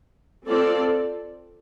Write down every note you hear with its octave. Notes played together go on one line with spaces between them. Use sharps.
C4 F4 A4 D5